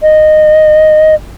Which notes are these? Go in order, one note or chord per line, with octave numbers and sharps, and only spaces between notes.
D#5